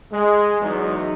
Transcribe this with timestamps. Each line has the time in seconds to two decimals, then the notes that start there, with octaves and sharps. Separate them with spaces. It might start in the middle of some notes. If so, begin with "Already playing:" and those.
0.12 G#3
0.62 E2 F#3 G#3 D#4